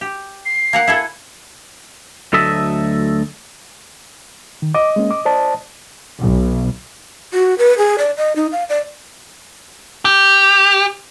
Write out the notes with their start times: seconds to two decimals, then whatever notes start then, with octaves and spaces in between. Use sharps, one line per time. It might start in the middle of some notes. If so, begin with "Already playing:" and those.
0.01 G4
0.45 C7
0.73 A#3 A#4 F#5
0.87 E4 G#4 A4
2.33 D2 F#3 A3 D#5 E5 A5
4.62 D#3
4.74 D#5 D6
4.96 G#3 A#3 C#4
5.11 D6
5.25 C5 D5 A5
6.21 B1
7.33 F#4
7.58 B4
7.78 G#4
7.98 D5
8.17 D#5
8.36 D#4
8.52 F5
8.69 D5
10.05 G4